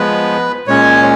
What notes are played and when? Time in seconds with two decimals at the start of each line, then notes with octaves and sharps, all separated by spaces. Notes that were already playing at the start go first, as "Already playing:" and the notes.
Already playing: F3 G#3 B3 B4
0.67 A#2 G#3 C#4 C#5